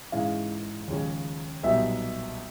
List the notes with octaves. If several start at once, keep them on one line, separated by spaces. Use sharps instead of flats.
G#2 E3 G#3 C#4 E4 F5
D#2 C#3 F3 G#3 C#4
B1 A#2 G3 B3 D#4 E5